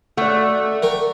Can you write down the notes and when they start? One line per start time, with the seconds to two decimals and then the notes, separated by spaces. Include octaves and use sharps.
0.17 A3 D5 F#5
0.83 A#4 G5 C#6